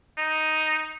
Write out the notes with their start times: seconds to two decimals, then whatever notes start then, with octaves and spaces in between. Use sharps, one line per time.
0.18 D#4